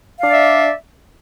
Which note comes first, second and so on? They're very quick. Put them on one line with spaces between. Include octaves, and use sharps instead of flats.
F5 D4 D5 E5